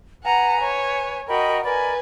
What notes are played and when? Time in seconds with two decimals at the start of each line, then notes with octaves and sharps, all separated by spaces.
0.24 B4 F#5 G#5 A#5
0.61 C#5
1.28 F#4 A#4 D#5 G5 B5
1.64 A#4 B4 D5 G#5 B5